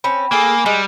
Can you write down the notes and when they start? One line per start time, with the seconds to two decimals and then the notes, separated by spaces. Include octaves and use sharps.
0.04 C4 C#4 B5
0.32 A#3 G#4 A4 G#5
0.66 G3 G#3